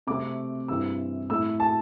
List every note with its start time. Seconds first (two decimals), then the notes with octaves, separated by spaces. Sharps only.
0.07 C3 A3 C4 D6
0.68 G2 E3 C4 E4 E6
1.29 A2 A3 E4 E6
1.60 A5